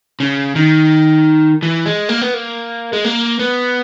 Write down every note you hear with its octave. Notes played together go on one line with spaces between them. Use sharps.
C#3
D#3
E3
G#3
A#3
B3
A#3
G#3
A#3
B3